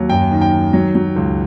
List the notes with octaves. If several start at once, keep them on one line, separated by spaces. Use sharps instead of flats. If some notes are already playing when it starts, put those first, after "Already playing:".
Already playing: D#2 F#3
F#2 G5
D#3
G5
D#3
F#3
F#3
C#2